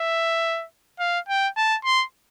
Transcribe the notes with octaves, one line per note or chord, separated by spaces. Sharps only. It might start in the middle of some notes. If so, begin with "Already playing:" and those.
Already playing: E5
F5
G5
A5
C6